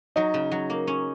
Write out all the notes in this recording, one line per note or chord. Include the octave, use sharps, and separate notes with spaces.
F#3 D#4
C#3
F#3
A#3
C#4